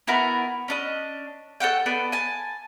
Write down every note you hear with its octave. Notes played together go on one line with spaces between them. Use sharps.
B3 E4 F#4 A#4
C#4 D4 D#5
A4 C#5 F#5 G5
B3 A4 D5
G#5 A5